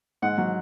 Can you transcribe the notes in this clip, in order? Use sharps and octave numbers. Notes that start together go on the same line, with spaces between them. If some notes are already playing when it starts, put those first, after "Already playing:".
G#2 F#5
F#3